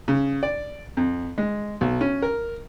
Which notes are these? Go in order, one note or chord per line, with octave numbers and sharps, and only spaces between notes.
C#3
D5
F2
G#3
B1
C#4
A#4